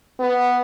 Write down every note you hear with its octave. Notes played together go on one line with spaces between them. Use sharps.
B3